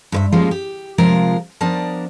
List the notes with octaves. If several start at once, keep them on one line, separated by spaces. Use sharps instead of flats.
G2 B4 E5
F3 G3 G#3 A#3 C#4 F4
G4
C3 F3 G#3 F4 A#4
F3 B3 D4 A#4 D5 A5